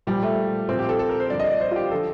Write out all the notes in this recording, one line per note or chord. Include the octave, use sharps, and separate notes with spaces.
A#2 F3 G3
A3
A#2 F3 C4
G4
A4
A4
A#4
C5
G2 D3 F3 D5
D#5
D5
C5
F4
G4
D3 F3 A4